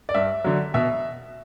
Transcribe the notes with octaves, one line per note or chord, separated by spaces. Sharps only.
D5
G2 E5
D3 F#3
B2 E5